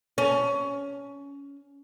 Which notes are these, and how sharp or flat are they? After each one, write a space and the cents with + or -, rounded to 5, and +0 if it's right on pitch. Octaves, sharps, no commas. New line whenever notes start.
C#4 +20